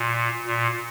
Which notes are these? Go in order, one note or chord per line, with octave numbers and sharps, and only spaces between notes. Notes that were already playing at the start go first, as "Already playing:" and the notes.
Already playing: A#2
A#2